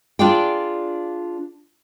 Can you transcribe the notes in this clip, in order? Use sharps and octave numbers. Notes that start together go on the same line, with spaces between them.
D4 F4 G#4 D5 F5 G5